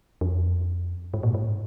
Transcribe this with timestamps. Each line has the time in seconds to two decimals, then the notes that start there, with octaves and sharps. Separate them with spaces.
0.21 F2
1.14 G#2
1.23 A#2
1.34 G#2